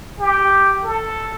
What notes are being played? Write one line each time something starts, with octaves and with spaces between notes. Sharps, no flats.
G4
A4